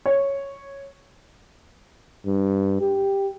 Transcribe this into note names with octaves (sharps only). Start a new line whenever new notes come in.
C#5
G2
G4